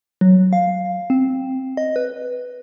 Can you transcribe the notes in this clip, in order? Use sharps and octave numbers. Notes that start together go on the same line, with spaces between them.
F#3
F5
C4
D#5
B4